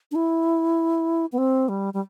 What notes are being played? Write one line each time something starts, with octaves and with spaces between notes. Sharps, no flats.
D4
E4
B3
C4
G3
G3